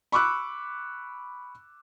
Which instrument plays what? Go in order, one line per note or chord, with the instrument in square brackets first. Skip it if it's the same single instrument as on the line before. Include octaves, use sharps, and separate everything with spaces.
[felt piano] B5 C#6 D6 E6 F#6